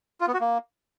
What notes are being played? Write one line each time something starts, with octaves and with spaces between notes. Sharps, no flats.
F4
B3
F#4
A#3